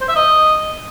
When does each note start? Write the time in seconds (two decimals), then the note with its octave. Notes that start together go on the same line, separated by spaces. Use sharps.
0.01 C5
0.08 E5
0.16 D#5